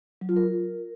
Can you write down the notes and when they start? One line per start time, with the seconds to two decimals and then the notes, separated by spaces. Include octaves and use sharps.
0.21 F#3
0.29 F4
0.36 A#4